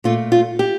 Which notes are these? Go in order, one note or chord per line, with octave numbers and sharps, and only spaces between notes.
A#2 A3 F4
F4
G4